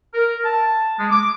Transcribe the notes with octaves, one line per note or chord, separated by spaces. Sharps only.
A#4
A5
G#3
D6